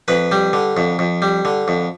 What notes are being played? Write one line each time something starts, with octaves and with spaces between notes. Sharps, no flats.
F2 B4
G3
D3
F2
F2
G3
D3
F2